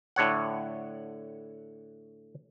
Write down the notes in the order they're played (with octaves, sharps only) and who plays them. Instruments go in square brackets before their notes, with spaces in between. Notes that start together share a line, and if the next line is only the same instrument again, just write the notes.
[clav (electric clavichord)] A2 D3 C#5 F#5